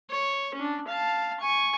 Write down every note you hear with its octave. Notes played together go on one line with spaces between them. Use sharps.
C#5
C#4 D4
F5 A5
G#5 C#6